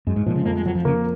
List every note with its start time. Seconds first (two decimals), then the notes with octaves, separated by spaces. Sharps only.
0.07 F#2 G#3
0.16 G#2
0.26 A#2 F3
0.36 C#3
0.45 F2 A#3
0.56 G#3
0.66 F2 F#3
0.75 F3
0.85 C#3 A#3